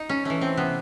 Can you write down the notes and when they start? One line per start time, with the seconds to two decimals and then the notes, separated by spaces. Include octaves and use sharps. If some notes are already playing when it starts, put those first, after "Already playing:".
Already playing: D#4
0.09 C#4
0.25 E3 A3 C#4
0.41 C4
0.57 C3 B3